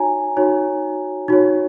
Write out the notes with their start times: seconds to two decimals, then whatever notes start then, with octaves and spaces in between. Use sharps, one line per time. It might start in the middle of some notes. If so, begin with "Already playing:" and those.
Already playing: D#4 F#4 C#5 G#5 A#5
0.37 D#4 F#4 C#5
1.28 D#4 F#4 C#5